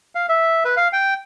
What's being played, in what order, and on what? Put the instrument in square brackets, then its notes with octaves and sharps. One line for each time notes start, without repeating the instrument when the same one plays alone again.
[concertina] F5
E5
B4
F5
G5